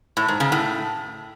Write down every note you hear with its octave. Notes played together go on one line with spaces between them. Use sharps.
A2
G#2
C#3
A2